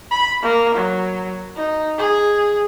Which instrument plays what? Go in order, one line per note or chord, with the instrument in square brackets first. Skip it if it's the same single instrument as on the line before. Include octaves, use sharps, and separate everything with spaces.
[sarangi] B5
A#3
F#3
D#4
G#4